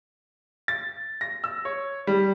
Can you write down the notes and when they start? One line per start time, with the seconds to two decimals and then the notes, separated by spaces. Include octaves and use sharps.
0.68 A6
1.21 A#6
1.44 E6
1.65 C#5
2.07 G3